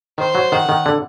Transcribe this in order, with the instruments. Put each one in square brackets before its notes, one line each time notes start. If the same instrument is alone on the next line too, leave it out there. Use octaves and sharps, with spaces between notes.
[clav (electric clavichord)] D#3 [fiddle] C5
[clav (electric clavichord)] F#3
[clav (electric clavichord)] D#3 [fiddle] F#5
[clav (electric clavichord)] D#3
D3